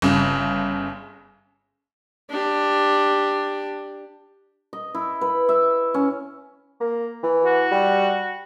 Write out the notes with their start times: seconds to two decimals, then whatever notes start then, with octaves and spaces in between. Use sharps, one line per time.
0.02 G1 C#3
2.30 D4 G4
4.73 D#5
4.95 E4
5.21 B4
5.49 E5
5.94 C#4
6.81 A#3
7.23 E3
7.45 F#4
7.71 G3